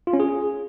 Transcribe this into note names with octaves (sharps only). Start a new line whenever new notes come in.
F4
C#4
G#4